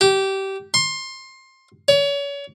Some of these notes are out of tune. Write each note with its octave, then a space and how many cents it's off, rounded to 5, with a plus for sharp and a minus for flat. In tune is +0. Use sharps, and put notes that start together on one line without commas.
G4 -20
C6 +20
C#5 +35